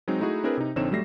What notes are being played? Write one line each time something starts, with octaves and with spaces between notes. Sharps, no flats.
F#3 G#3 C4 D#4
A3 D#4 E4 F#4 G#4
C4 D4 E4 G#4 A#4 B4
C3 D#4
A#1 D3 C4 D#4 C#5 E7
F#3 G3 A3 E5 A#6 C7